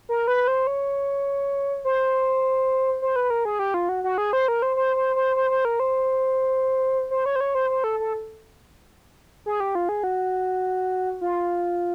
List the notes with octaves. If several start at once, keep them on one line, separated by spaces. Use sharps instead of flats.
A#4
B4
C5
C#5
C5
C5
B4
A#4
G#4
G4
F4
F#4
F#4
G#4
C5
A#4
C5
C5
C5
C5
C5
C5
A#4
C5
C5
C#5
C5
C#5
C5
C5
A4
A4
G#4
G4
F4
G#4
F#4
F4